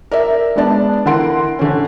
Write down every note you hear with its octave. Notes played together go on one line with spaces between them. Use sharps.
A#4 D5 E5
G#3 B3 D4 D5 A5
D3 E3 A#4 F#5 C6 D7
A2 D3 E3 C#4